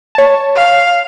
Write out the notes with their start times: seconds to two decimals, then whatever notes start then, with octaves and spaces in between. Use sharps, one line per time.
0.15 C#5 A5
0.55 F5